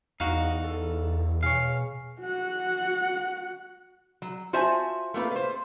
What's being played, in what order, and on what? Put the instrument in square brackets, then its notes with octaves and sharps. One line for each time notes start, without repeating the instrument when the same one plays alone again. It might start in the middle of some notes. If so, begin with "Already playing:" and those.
[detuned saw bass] E2 [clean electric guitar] D#4 F#4 [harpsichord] F5
[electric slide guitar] A4
[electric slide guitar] B2 G#4 G#5 [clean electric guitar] C#5 F5
[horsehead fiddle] F#4 F#5
[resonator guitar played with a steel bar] F#3
F4 F#4 C5 E5 G#5 A5
A3 A#3 F4 B4
B4 C5